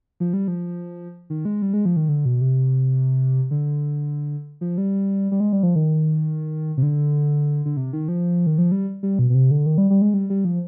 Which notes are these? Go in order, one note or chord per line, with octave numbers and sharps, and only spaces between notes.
F3
G3
F3
D#3
G#3
G3
G#3
F3
D#3
D3
B2
C3
D3
F3
G3
G3
G#3
G3
F3
D#3
C3
D3
D3
C3
D#3
F3
D#3
F3
G3
G3
B2
B2
C3
D3
D#3
G3
G3
G#3
G3
G3
F3